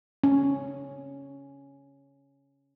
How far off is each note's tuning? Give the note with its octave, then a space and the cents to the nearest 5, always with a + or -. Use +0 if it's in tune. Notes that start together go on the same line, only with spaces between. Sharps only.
C#4 +0